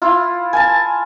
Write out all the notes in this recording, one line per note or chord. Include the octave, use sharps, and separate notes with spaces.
E4 F4
G#5 A5